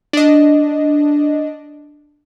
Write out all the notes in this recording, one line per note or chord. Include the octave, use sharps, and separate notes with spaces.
D4 D#5